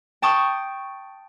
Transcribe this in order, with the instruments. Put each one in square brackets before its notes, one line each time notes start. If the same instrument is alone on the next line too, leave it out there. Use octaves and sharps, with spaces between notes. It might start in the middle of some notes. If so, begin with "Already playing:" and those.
[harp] G5 A5 C#6 D#6